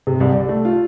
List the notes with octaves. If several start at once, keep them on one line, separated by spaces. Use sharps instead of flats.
C3
C2
D5
A3
F4